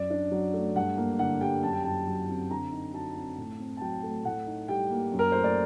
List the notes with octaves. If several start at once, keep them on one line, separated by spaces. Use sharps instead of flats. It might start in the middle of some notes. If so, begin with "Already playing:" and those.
Already playing: F#2 D5
D4
F#3
A3
G2 F#5
A#3
D3 F#5
G3 G5
F#2 A5
G5
F#2 A5
F#3
C4
D3 A#5
D#4
F#3 A5
C4
A2
C4
A5
F#3 G5
A3
A2 F#5
D#4
G3 G5
A#3
F#2
A#4
A3 C5
D5